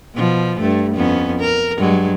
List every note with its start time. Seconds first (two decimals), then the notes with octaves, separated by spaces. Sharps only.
0.15 B2 F3
0.60 G2 A3
0.95 F2 B3 C#4
1.40 A#4
1.78 G2 F#3 G#3